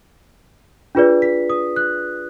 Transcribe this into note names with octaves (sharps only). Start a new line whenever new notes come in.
D4 F4 G#4 B4 D5
B6
D#6
F#6